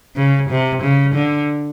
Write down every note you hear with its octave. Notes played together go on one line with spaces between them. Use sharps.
C#3
C3
C#3
D3